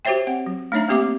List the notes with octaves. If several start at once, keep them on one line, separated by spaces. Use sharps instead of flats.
F#4 G4 C5 C#5 E5 G5
C4 F#5
F#3
A3 D4 D#4 C#5 E5 A#5
A#3 C4 G4 E5 D6